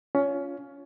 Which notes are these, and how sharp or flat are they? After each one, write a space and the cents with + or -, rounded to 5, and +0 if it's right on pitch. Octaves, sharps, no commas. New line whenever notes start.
C#4 +20 F4 +0